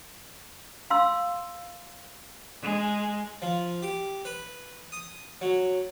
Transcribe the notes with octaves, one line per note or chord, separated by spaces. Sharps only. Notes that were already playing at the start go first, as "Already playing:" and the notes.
F5 C6 E6
G#3
F3
G4
B4
D#6
F#3